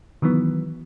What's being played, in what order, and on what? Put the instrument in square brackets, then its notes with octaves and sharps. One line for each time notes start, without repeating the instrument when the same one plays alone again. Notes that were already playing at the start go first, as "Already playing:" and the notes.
[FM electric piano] D#3 E3 F#3 B3